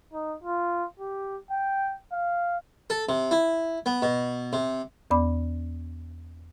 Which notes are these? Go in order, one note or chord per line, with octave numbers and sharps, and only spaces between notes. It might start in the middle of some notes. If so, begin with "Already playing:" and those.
D#4
F4
G4
G5
F5
A4
C3
E4
B3
B2
C3
E2 B3 D5 B5 D6